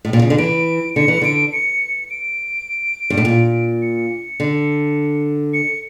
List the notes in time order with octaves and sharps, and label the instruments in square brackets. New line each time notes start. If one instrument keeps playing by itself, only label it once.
[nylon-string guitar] A2
A#2
C#3
D3
[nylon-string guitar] E3 [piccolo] D7
[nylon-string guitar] D3 [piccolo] C#7
[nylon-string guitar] E3
[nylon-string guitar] D3 [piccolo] D7
[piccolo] C#7
D7
[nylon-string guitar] G2
A2
A#2
[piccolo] C#7
[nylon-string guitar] D3
[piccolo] C#7